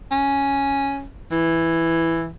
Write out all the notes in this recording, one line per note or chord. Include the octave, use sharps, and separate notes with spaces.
C#4
E3